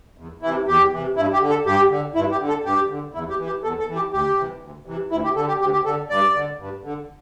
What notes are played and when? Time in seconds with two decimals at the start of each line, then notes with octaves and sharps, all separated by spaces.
0.18 E2
0.42 C3 E3 E4
0.68 E2 G4
0.92 C3 E3
1.16 G2 E4
1.33 G4
1.41 D3
1.49 A4
1.66 G2 G4
1.91 D3
2.15 G2 E4
2.32 G4
2.40 D3
2.48 A4
2.64 G2 G4
2.89 D3
3.14 E2 E4
3.30 G4
3.39 E3
3.46 G4
3.63 E2 A4
3.80 A4
3.89 E3
3.96 G4
4.12 D2 G4
4.37 C3 E3
4.61 D2
4.86 C3 E3
5.11 D2 E4
5.24 G4
5.36 D3 A4
5.48 G4
5.60 D2 G4
5.73 G4
5.85 D3 A4
6.10 G2 D5
6.35 D3
6.59 G2
6.84 D3